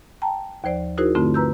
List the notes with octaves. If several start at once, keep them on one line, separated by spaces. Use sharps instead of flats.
G5 A5 A#5
D#2 F3 C5 D5
D#4 E4 F#4 G#4 A#4 C5
G2 D3 A3 C4 F4
B4 A#5 E6 G6